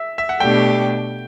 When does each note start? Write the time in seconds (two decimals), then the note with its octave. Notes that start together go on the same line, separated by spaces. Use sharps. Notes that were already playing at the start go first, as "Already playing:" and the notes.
Already playing: E5
0.18 E5
0.29 F#5
0.40 B2 A3 D4 G4 G5